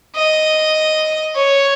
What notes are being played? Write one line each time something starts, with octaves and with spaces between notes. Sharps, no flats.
D#5
C#5